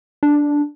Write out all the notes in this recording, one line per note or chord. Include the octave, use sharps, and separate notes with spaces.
D4